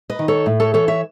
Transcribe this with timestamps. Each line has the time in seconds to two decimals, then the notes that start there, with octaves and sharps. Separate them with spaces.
0.10 B4 D#5
0.19 D#3
0.28 A4 C#5
0.46 A2
0.60 A4 C#5
0.74 E3 A4 C#5
0.88 C#5 E5